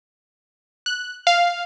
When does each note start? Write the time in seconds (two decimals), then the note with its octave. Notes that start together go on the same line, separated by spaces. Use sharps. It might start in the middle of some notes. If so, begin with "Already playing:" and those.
0.86 F#6
1.27 F5